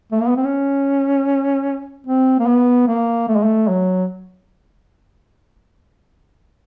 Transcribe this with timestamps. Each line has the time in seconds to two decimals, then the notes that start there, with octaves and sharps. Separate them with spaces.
0.11 A3
0.20 A#3
0.27 B3
0.36 C4
0.44 C#4
2.07 C4
2.39 A#3
2.47 B3
2.87 A#3
3.28 A3
3.36 G#3
3.43 A3
3.68 F#3